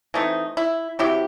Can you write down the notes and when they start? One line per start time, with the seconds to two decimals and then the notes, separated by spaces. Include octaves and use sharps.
0.14 E3 A3 C4 D#4
0.57 E4
0.99 C3 F#3 C4 E4 G4